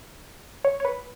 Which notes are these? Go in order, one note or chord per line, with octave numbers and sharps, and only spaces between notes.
C#5
C#5
B4